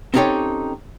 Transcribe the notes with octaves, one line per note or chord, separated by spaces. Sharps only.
C4 C#4 D#4 G4 A4 C#5